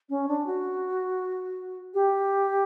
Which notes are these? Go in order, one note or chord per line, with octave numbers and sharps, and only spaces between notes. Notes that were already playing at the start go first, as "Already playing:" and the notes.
C#4
D4
F#4
G4